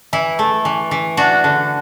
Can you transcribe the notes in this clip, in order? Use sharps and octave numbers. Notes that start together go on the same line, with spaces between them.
E3 E4
A3
E3
E3
D4 F#4
D3